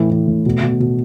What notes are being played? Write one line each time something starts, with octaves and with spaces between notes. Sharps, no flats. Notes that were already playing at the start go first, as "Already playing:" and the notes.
Already playing: A2 E3
E3
A2
B2
B2
B2